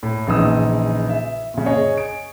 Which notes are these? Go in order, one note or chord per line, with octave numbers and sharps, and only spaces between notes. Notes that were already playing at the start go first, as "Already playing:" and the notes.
A2
A#1 C#3 E3 D#4 D#6 E6
E5
A#2 C#3
G#4 C#5 D#5
D7